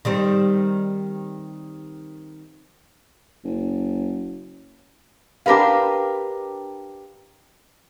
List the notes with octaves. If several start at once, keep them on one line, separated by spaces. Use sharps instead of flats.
D#3 G3 C4
F#1
D4 G4 A#4 B4 F5